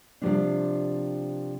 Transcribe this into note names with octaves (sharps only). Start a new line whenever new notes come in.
C3 F3 G3 G#3 C#4 D4